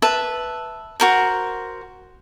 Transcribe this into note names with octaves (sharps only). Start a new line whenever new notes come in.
B4 E5 A5
F#4 A#4 C5